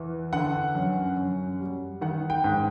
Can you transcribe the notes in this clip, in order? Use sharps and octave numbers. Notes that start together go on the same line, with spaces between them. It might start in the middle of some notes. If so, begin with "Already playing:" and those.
Already playing: E2 E3
D3 F#5
F#2
F#2
G3
D#3 F#5
G5
G#2